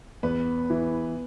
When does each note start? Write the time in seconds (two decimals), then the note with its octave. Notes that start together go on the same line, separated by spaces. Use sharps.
0.23 E2 B3 B4
0.70 E3